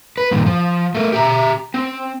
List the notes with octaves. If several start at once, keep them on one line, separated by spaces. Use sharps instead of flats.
B4
G2 A#2 D#3
F3
A3 A#4
G4 E5 A#5
C4